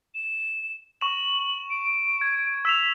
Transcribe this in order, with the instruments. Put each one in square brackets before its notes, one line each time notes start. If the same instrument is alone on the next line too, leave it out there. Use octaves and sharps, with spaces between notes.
[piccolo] E7
[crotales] C#6 E7 [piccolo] F#7
[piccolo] D7
[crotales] G#6
[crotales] E6 E7 F7 [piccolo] B6